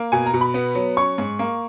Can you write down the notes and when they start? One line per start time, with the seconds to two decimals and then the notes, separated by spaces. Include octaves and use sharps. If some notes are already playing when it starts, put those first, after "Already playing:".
Already playing: A#3
0.12 B2 G#5
0.26 A#5
0.34 B2
0.41 B5
0.54 B3
0.75 F#3
0.97 C#4 C#6
1.18 G#2
1.39 A#3